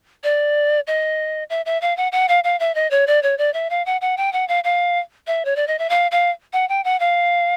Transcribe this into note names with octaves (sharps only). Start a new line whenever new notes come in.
D5
D#5
E5
E5
F5
F#5
F#5
F5
F5
E5
D#5
C#5
D5
C#5
D5
E5
F5
F#5
F#5
G5
F#5
F5
F5
E5
C#5
D5
D#5
E5
F5
F5
F#5
G5
F#5
F5